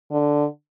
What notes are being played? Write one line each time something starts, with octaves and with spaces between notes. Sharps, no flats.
D3